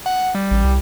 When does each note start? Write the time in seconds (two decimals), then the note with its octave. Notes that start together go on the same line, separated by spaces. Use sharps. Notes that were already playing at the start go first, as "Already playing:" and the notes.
0.06 F#5
0.35 G3
0.51 A1
0.64 C2